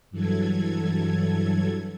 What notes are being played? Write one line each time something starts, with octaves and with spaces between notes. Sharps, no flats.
G2 E3 F#3 A4 G#6